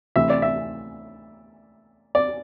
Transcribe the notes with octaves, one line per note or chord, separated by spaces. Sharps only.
D2 C3 E3 E5
D5
E5
D5